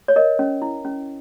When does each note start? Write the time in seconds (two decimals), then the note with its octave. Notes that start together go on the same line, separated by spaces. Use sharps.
0.08 C#5
0.16 A#4 D#5
0.39 C#4
0.62 E4
0.85 C#4